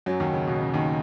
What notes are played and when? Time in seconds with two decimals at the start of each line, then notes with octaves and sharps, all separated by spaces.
0.06 F#2 F#3
0.20 D#2 D#3
0.33 C#3
0.47 B2
0.61 C#3
0.74 D#2 D#3